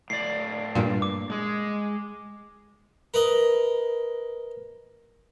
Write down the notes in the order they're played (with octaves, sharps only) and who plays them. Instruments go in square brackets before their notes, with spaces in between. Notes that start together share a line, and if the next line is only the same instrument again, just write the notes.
[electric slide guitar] A2 D5 [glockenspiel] C7
[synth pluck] G2 A#2
[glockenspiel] D6
[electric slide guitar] G#3 G#4 [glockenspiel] D6
[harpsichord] A#4 B4 D#5